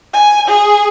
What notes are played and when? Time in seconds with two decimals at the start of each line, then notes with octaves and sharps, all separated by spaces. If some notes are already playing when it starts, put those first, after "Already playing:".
0.14 G#5
0.48 G#4